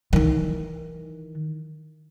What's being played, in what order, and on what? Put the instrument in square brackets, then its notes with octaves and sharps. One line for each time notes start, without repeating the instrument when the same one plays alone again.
[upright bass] D#3 E3